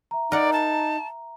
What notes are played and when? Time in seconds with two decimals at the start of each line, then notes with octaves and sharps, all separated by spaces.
0.11 E5 A#5
0.32 D#4 A#4 D5 F#5
0.53 A5